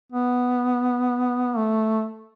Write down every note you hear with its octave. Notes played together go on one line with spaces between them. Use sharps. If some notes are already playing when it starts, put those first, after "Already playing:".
B3
A3